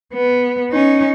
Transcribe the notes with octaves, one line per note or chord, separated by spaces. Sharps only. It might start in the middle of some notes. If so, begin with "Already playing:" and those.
B3
C#4 D#4